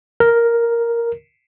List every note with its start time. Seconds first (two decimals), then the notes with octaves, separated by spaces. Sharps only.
0.20 A#4